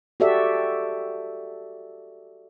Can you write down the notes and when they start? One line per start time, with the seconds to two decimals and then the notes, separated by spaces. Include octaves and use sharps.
0.20 F#4 G4 A4 D5 E5